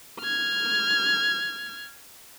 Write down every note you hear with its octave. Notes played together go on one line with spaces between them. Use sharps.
F6 G#6